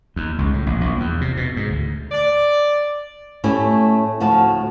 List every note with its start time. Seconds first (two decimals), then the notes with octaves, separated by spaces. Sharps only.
0.16 D#2
0.38 C#2
0.53 A2
0.66 A#1
0.81 A#1
1.00 E2
1.21 C3
1.37 B2
1.57 G#2
1.70 D2
2.12 D5
3.44 A2 A3 C#4 E4 G4
4.20 D2 A2 F3 F#4 A5